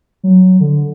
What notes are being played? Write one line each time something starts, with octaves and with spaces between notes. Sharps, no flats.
F#3
D3